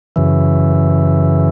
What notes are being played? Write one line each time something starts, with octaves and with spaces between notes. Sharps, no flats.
F#2 C#3 E3